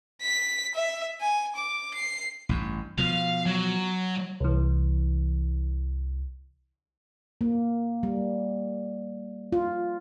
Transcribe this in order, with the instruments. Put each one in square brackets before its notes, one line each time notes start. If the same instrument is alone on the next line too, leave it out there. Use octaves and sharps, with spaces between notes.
[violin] B6
E5
G#5
D6
C7
[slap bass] A1 G2
[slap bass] B2 F3 [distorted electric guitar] F5
[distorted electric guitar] F#3
[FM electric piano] C2 E3
[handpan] A#3
G3
F4